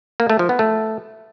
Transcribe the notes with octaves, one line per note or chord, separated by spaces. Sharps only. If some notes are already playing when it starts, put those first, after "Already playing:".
A#3
A3
F3
B3
A3